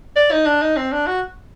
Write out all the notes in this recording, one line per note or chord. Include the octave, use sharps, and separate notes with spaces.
D5
D#4
D4
D#4
C4
D4
F#4